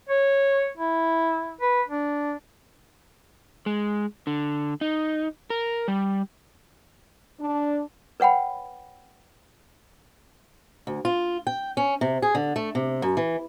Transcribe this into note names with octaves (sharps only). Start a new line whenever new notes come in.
C#5
E4
B4
D4
G#3
D3
D#4
A#4
G3
D4
B4 C#5 F#5 G5 B5
D2
F4
G5
C#4
C3
G#4
D3
A3
C3
F#2
E3